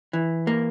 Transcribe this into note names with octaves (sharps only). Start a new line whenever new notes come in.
E3
A#3